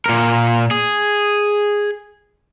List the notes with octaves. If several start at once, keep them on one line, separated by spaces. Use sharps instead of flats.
A#2 A#4
G#4